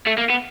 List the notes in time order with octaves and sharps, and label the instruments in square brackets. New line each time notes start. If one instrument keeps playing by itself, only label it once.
[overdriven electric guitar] A3
A#3
B3